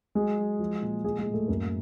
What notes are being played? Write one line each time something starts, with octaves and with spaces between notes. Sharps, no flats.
F#3 G#3 G#4
F#3
F3
A#2
G#3 G#4
G#3 G#4
A2
A3 A4
F#2 A#3 A#4